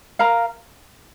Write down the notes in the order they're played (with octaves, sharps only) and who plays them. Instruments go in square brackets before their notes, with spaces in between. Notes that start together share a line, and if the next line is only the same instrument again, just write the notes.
[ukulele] A#4 F5 A#5